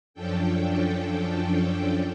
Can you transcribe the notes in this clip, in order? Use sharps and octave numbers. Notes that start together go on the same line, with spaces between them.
F#2 F3 C#4 D4 A4 G5